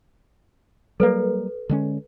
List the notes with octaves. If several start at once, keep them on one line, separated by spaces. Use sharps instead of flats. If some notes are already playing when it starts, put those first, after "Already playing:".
F#3 G3 A#3 A4 B4
D3 G#3 C#4